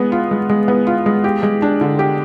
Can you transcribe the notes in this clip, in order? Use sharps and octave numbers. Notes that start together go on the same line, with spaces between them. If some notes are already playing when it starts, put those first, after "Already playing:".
Already playing: G#3 B3
F4
G#3
G#3
B3
F4
G#3
G4
G#3
D4
D3
G4